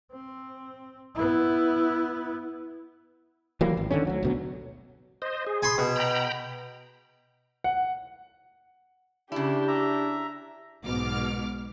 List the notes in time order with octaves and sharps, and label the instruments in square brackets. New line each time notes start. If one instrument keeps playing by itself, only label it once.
[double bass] C4
B3 E4
[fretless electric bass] E3 F#3 G3 A#3
G#1
D3 D#3 G#3 C#4
D2 F#3
D2 B2 F#3
[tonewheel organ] C5 D#5
G#4
[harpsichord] G#5 B5 C6
B2
[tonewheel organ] G5 A#5 B5
[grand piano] F#5
[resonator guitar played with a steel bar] C#3 E4 [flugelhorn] D4 [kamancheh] G4
[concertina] E5 A#5
[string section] B1 G#2 B2 D6 F6